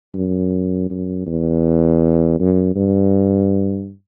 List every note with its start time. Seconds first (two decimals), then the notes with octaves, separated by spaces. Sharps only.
0.15 F#2
0.90 F#2
1.26 E2
2.39 F#2
2.76 G2